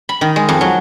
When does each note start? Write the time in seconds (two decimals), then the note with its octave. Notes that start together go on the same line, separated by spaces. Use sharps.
0.09 B5
0.21 D#3
0.36 G#3
0.49 F2
0.61 F#3